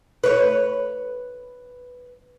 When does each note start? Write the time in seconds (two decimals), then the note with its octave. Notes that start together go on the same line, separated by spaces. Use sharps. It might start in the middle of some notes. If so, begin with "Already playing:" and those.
0.24 B4 C#5